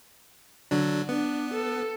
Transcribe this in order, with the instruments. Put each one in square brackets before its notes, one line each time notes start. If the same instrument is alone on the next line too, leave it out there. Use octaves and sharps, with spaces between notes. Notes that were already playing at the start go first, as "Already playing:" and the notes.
[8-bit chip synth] D3 F#3 D4
[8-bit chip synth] B3 [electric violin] D4
[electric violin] A4